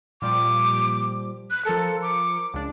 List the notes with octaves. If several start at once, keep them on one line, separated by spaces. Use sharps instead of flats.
A#2 F3 G3 D6
F#6
F3 A4 A#4 C#7
D6
C#2 D4